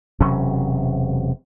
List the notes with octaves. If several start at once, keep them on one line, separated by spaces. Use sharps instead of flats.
E1 C3 F#3 C#4